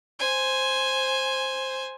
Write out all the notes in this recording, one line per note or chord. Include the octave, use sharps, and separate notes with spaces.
C5 G#5